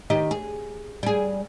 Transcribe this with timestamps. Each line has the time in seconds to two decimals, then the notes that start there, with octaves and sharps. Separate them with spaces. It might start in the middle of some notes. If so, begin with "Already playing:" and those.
0.10 D#3 G4 D#5
0.31 G#4
1.03 G3 G#4